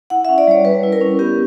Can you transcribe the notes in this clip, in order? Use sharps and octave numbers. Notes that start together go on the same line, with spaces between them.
E4 F#5
E5
C#4
D5
G3 C#5
G3 B4
E4
A#4
C#4
B3 G4